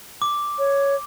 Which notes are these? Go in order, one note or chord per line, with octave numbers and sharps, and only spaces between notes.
D6
C#5